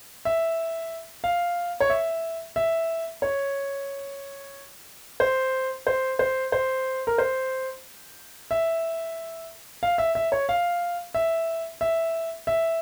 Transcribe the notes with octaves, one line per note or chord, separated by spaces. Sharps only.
E5
F5
C#5
E5
E5
C#5
C5
C5
C5
C5
A#4
C5
E5
F5
E5
E5
C#5
F5
E5
E5
E5